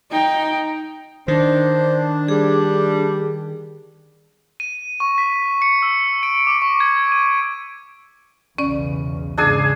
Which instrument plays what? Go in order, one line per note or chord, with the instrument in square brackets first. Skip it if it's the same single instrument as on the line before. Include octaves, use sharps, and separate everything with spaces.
[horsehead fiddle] D#4 G5
[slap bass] D#3 [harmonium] D4 [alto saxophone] C5
[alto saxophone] G3 [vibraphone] G#4
[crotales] D#7
C#6
B6
C#7
E6
D7
D6
C#6
G#6
D#7
[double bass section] B1 E2 C#3 [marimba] C#4 D5
[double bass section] E2 G#2 C#3 [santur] D4 G#4 G#5